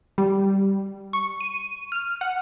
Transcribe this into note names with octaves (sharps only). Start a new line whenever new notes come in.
G3
C#6
D#7
F6
F#5